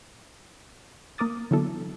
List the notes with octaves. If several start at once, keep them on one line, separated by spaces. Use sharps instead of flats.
A#3 A#4 D6 D#6 A6
D3 E3 F#3 B3 E4 A4